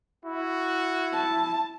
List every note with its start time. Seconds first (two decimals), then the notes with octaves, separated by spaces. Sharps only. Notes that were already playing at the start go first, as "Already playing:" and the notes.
0.25 E4 F#4
1.13 A5